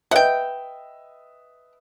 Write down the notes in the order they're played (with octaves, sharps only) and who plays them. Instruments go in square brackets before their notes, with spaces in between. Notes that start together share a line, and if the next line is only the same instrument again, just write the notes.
[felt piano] B4 D#5 E5 [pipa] F#5 G5